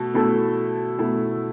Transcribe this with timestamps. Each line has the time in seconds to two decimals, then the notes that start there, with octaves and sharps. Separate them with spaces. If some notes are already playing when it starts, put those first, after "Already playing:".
Already playing: B2 A3 A4
0.14 B2 A3 E4 A4
0.99 B2 A3 E4 A4